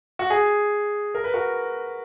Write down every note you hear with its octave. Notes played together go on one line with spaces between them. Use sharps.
F#4
G#4
A#4
B4
F#4 A#4